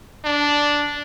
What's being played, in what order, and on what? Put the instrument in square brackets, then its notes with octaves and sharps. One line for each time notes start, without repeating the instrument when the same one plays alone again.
[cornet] D4